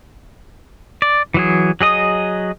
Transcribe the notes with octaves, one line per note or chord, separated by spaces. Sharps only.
D5
E3 F#3 G#4
F#3 G#4 D#5 D#6